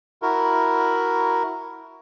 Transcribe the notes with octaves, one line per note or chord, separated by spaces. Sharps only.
E4 F#4 A#4